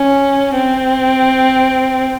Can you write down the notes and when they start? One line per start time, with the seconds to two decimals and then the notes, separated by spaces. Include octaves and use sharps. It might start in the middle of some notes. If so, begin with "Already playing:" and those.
Already playing: C#4
0.54 C4